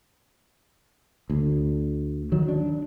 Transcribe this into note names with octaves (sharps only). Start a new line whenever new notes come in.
D2
D#3 F#3
D4